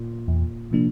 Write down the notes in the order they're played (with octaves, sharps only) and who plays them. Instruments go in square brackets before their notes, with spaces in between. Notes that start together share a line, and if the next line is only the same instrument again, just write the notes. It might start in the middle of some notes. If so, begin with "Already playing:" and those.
Already playing: [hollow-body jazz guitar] A#2
[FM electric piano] E2
C3 F3 A#3 D4